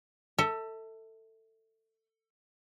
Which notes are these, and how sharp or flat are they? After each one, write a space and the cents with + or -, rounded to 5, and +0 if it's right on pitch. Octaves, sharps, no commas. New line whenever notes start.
A4 +20 E5 -25